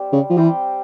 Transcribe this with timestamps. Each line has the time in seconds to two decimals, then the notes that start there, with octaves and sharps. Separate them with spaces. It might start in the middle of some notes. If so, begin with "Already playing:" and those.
Already playing: G3 C4 G4 C5
0.12 C#3
0.30 F3
0.37 E3 G3 C4 G4 C5